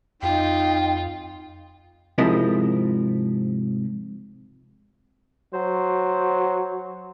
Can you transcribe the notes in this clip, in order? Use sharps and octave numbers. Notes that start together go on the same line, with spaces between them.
F2 D#4 F4 G5
G#2 C3 F3 E4 A#4 D#5
F#3 C5